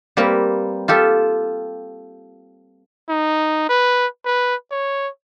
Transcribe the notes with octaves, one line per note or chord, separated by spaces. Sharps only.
G3 A#3 C4 A#4 B4
F4 G4 A4 E5
D#4
B4
B4
C#5